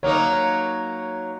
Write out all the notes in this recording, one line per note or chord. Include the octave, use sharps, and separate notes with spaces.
F#3 A#3 D#4 C#5